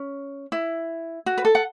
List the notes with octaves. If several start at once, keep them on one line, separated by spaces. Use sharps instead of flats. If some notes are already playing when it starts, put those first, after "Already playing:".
Already playing: C#4
E4
F#4
B4
A4
F#5